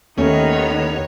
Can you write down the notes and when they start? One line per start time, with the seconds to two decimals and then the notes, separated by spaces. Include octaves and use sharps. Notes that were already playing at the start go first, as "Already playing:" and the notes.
0.18 D#2 D#3 A3 B3 C#4 D#4 C#5